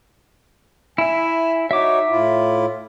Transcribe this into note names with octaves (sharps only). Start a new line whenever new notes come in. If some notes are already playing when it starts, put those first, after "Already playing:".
E4 E5 G#5
D#4 F#4 C#5 E5 D6
A2 E4 F4